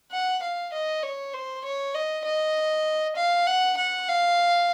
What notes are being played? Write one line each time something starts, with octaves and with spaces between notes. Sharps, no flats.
F#5
F5
D#5
C#5
C5
C#5
D#5
D#5
F5
F#5
F#5
F5